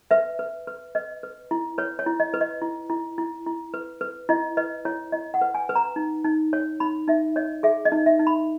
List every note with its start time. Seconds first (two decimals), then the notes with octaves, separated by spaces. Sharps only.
0.11 B4 E5
0.39 B4
0.67 B4
0.95 B4 D#5
1.23 B4
1.51 E4
1.78 B4 C#5
1.99 C#5
2.06 E4
2.20 D#5
2.34 B4
2.41 D#5
2.62 E4
2.90 E4
3.18 E4
3.46 E4
3.74 B4
4.01 B4
4.29 E4 D#5
4.57 B4 D#5
4.85 E4 C#5
5.12 E4 D#5
5.34 F#5
5.41 B4
5.54 G#5
5.69 B4
5.75 A#5
5.96 D#4
6.25 D#4
6.53 C#5
6.80 D#4 B5
7.07 D#4 E5
7.36 C#5 D#5
7.63 G#4 E5
7.85 D#5
7.92 D#4
8.06 E5
8.19 D#4
8.27 B5